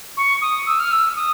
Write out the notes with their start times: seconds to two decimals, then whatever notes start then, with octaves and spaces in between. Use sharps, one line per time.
0.17 C#6
0.41 D#6
0.66 E6
0.79 F6
0.91 E6
1.15 D#6